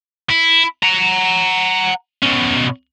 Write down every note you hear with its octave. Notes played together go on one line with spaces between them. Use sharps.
E4
F#5 A#5
B2 C#4